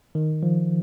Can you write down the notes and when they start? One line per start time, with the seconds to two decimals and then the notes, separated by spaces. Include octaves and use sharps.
0.15 D#3
0.43 F3